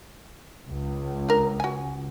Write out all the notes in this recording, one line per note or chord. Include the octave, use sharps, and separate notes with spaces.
C#2
D4 A#4
F#4 G#5